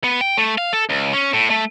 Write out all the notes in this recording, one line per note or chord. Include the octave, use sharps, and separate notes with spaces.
B3
G5
A3
F5
A4
C#2
C#4
A2
A3